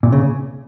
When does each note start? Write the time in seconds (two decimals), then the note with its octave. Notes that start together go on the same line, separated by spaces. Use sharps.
0.03 A#2
0.12 C#3